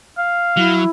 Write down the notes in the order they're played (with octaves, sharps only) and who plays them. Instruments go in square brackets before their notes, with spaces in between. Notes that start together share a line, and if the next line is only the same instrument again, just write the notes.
[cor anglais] F5
[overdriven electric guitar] F#3 [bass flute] E4